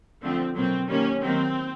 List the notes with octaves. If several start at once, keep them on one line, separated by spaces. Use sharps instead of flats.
D3 F3 A3 C4
B2 F#3 A#3 C4
D#3 G3 A#3 C#4
D#3 F#3 A#3 C4